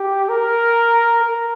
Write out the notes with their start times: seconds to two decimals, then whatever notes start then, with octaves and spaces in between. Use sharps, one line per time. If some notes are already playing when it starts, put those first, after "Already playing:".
Already playing: G4
0.29 A#4
1.22 A#4